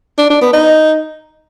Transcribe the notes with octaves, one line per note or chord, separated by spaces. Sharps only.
D4
D4
B3
D#4